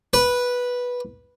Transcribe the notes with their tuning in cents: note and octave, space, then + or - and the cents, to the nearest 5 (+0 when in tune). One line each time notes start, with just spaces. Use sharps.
B4 -10